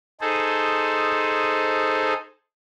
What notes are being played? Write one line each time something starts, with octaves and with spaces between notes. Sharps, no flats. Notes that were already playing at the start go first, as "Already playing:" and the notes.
D#4 G#4 A4 C5